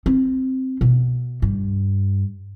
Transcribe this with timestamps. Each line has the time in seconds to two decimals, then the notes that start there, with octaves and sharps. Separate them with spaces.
0.06 C4
0.81 B2
1.42 G2